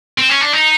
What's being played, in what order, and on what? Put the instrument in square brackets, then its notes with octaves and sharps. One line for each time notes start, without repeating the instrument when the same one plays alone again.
[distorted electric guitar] C4
C#4
D4
D#4